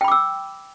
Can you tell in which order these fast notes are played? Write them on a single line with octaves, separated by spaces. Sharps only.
G5 B5 D6 E6